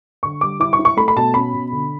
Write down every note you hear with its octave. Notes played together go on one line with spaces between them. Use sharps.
D3 C#6
G3 D6
E4 D6
C#6
E4
C#6
A3 B5
B5
B2 A5
C#4 B5
B2
D3